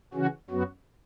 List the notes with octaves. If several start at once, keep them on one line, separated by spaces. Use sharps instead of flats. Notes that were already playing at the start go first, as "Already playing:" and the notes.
C#3 E3 C#4 F#4
F#2 F#3 B3 F#4